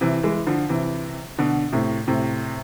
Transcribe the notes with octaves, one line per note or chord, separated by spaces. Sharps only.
C3 E3
E3 G#3
D3 F3
C3 E3
B2 D3
A2 C3
A2 C3